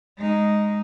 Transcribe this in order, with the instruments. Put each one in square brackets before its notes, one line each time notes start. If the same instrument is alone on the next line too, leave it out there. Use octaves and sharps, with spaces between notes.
[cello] G#3 D#4